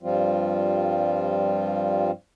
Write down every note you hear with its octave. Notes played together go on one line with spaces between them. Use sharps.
G2 F3 G3 C4 F4